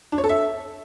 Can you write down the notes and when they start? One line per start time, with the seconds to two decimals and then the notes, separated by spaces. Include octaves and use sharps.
0.12 D4
0.18 C#5
0.24 A4
0.29 E5